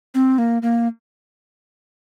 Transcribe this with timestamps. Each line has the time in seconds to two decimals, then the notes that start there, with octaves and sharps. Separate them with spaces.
0.15 C4
0.38 A#3
0.62 A#3